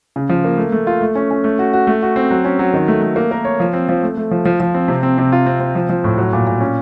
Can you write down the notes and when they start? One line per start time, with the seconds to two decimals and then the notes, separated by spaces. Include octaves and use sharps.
0.16 C#3
0.29 F3
0.45 A#3
0.58 A3
0.72 A3
0.87 F4
1.01 A3
1.15 C#4
1.31 C#4
1.44 A3
1.59 F#4
1.73 F#4
1.87 A3
2.02 F#4
2.16 C4
2.31 F#3
2.45 C#4
2.59 F#3
2.74 D#3
2.88 A3
3.02 A3
3.16 A#3
3.31 A#4
3.45 C#5
3.60 F3
3.73 C4
3.89 F3
4.03 A3
4.17 A3
4.31 F3
4.45 F3
4.60 F3
4.74 C4
4.88 C3
5.03 C4
5.18 C3
5.32 F4
5.46 C4
5.60 C4
5.75 F3
5.89 F3
6.04 A2
6.18 F#3
6.33 A#2
6.47 A#2
6.60 C#4